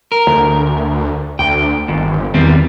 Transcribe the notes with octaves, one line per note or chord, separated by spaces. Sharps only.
A#4
D2
D2 G5
G1 D#2
E2 D#3 G3 C4